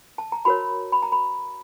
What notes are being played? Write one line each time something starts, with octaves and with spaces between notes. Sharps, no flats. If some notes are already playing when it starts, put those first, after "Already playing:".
A5
A#5
F#4 A#4 C#5 B5
B5
A#5
B5